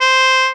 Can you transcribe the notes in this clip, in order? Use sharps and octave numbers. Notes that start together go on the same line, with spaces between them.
C5